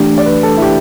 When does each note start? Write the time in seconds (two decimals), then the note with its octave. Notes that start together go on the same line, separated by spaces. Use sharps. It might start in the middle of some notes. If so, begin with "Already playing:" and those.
Already playing: E3 A3 D4 G4
0.18 D5
0.26 B4
0.43 A4
0.57 E4
0.62 G4